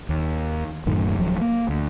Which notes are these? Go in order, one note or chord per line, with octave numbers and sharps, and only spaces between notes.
D#2
D1 F#2 A2 D#3
D1 F3 F#3
A#3
D2